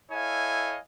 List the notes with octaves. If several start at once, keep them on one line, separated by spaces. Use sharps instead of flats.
E4 A4 C#5 D#5 F5 G#5